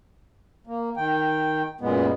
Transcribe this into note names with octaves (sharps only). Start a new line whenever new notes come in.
A#3
D#3 G5
F#2 A#2 G#3 B3